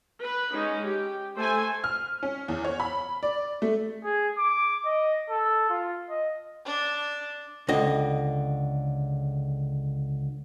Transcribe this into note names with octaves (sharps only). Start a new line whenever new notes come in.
B4
G#3 C#4 D#4
G4
A3 A4 C5 G#5
F6
C#4
E2
C#5
B5
D5
A3
G#4
D6
D#5
A4
F4
D#5
D4
C#2 D3 D#5